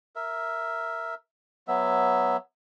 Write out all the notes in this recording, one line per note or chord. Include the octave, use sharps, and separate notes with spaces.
A#4 E5
F#3 B3 E5